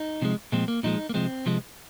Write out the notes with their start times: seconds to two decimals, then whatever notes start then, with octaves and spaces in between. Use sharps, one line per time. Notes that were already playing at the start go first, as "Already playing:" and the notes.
Already playing: D#4
0.22 C3 F3 G#3
0.52 A#2 F3 G#3 C4
0.68 A#3
0.83 A#2 F3 G#3 D#4
1.09 A#3
1.14 C3 F3 G#3 C4
1.46 C3 F3 G#3